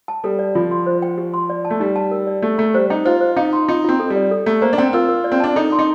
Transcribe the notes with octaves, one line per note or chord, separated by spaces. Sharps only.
A5
G3 A4
D5
F3 F4
C6
C5
G5
G4
C6
D5
A5
A3
G3 D#4
A5
A#4
D5
A3 G4
A3 A#5
G3 C5
D#4 G5
F4 C5
C5
D#4 F5
C6
D#4 F4
C4 F4
A4
G3
D5
A4
A3 A#5
A#3 C5
D4
C4 G5
F4 A#4
A#4
D5
C4
D4 A5
D#4 A4
C6
D#4